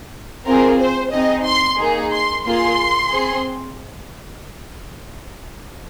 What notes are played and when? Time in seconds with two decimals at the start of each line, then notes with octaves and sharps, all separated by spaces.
0.47 C4 F4 G#4 A#4
0.79 C5
1.13 C4 D#4 G#4 D#5
1.45 C6
1.79 A#3 D#4 G#4
2.12 C6
2.45 A#3 F4 G#4 C6
3.11 C4 G#4